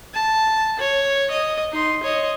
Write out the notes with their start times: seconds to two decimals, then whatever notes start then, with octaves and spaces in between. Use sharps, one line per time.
0.14 A5
0.79 C#5
1.30 D#5
1.72 D#4 C6
2.03 C#5 D#5